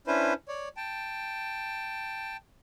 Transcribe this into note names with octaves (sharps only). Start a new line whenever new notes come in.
C#4 D4 E4 B4 C5
C#5 D5
G5 A5